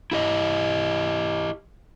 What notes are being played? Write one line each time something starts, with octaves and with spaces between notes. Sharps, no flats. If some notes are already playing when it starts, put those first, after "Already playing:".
E4 G4 D#5